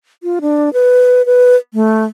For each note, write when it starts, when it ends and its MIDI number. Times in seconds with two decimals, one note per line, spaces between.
0.23 0.39 65
0.41 0.73 62
0.73 1.25 71
1.26 1.56 71
1.74 2.04 57